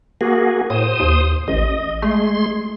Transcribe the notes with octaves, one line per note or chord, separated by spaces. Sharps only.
A#3 F#4 G#4
A2 C5 D#6
D#2
A1 D#5
G#3 A3 C6